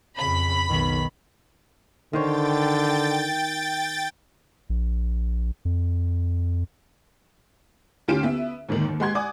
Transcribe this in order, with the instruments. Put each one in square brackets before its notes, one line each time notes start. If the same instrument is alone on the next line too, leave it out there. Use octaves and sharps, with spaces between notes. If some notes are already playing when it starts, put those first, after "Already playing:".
[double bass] F2 C#3 [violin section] B5
[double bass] B1 D#3
[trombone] D3 [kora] D#3 C5 C#5 [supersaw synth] G5 A6
[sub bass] A#1
F2
[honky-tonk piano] D2 C#4 F4 G4 D7 E7
B3 E5
D#2 G#2 D3 D#3
D#2
G#3 G4 F#5 C6 G#6
D5 F#5 G#5 D6 D#6